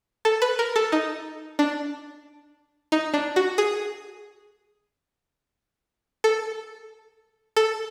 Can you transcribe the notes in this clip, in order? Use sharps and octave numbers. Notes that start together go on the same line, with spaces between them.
A4
B4
A#4
A4
D#4
D4
D#4
D4
F#4
G#4
A4
A4